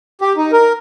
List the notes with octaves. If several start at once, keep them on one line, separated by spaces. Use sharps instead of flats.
G4
D#4
A#4